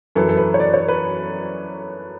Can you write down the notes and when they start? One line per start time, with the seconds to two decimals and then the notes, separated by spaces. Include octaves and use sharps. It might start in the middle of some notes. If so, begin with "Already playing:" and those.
0.15 F#2 E3 A4
0.29 A4
0.37 B4
0.54 C#5
0.60 D5
0.74 C#5
0.88 B4